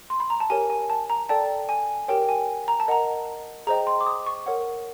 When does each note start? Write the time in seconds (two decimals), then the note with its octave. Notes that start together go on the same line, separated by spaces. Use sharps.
0.10 C6
0.20 B5
0.30 A#5
0.40 A5
0.50 G4 A#4 C#5 G#5
0.70 G#5
0.90 A5
1.10 A#5
1.29 A4 D5 G5 A5
1.69 G#5
2.08 G4 A#4 C#5 G5
2.29 G#5
2.68 A#5
2.80 A5
2.88 A#4 D#5 F#5 A#5
3.67 G#4 C5 D#5 G5 A#5
3.87 C6
4.01 D6
4.06 D#6
4.26 C#6
4.46 A#4 C#5 F#5